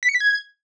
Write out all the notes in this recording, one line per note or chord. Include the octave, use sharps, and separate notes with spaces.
B6
C#7
B6
G#6